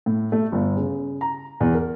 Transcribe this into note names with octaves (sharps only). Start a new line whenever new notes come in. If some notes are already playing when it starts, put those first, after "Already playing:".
A2
A3
G1
C#3
A#5
E2
A#4